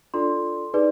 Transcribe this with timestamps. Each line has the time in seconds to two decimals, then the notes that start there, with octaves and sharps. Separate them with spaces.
0.14 D4 F4 A4 D5 C6
0.74 D#4 G#4 B4 D5